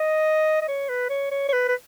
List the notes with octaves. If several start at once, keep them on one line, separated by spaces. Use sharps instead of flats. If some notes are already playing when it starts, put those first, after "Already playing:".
Already playing: D#5
D#5
C#5
B4
C#5
C#5
C#5
B4
B4